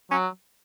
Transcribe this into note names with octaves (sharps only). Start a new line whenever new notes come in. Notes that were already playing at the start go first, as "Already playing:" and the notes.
F#3 C#4